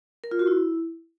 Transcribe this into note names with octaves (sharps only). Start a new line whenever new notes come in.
A#4
F4
F#4
E4